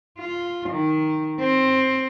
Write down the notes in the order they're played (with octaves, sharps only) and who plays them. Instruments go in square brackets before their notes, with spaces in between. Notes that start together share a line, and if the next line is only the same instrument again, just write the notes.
[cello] F4
D#3
C4